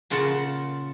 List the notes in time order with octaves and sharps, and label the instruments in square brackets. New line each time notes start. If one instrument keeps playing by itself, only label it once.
[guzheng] A#2 C#3 F4 A#4 F#5 A5